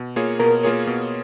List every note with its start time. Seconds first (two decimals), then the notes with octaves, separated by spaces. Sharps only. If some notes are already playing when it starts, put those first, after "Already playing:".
Already playing: B2
0.16 A#3 F4 G#4 C#5
0.40 B2 A#4
0.63 A#3 F4 G#4 C#5
0.87 B2